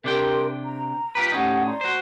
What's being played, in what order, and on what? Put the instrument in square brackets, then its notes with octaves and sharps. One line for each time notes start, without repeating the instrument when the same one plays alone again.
[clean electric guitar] C3 D4 G5 [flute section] G4 A#4 C6
[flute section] A#5
[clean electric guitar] F4 G4 B4
[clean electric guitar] A2 C#4 D#4 [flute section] G4 F#5
[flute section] D5 A#5 C6
[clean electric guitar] F#4 C5